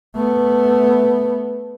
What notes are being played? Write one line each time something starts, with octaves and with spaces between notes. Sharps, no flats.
A3 B3